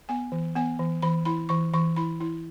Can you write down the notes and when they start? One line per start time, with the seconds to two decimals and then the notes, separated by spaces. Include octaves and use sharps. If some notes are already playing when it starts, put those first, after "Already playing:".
0.09 B3 G#5
0.32 E3
0.55 B3 G#5
0.79 E3
1.02 E3 B5
1.25 E4 B5
1.49 E3 C#6
1.74 E3 C#6
1.96 E4 B5
2.21 E4